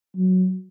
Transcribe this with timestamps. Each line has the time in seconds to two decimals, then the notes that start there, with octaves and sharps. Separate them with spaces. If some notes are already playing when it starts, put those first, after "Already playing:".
0.16 F#3